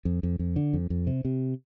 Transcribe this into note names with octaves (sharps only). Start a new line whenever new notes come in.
F2
F2
F2
D3
F2
F2
C3
C3